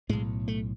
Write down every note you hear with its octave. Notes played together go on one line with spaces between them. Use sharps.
B1 A2 G#3
A3